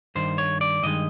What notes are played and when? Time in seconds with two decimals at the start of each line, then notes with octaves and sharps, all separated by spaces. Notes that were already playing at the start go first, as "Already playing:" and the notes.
0.15 G2 D#3 C5
0.38 C#5
0.61 D5
0.83 G2 D#3 G#3 D#5